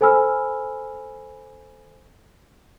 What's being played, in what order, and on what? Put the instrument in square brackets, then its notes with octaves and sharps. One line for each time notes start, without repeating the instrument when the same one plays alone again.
[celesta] A4 C5 G#5 B5 E6 F6